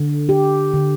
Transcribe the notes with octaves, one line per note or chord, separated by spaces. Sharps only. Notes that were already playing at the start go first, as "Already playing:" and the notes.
Already playing: D3
G4
D3